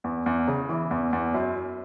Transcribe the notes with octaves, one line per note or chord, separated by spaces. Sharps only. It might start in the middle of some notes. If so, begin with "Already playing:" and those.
E2
E2
C#3
E3
E2
E2
F#2
F#2